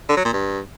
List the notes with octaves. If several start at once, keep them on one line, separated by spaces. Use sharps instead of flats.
D3
F#3
A#2
G2